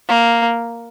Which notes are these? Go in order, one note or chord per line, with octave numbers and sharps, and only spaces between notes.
A#3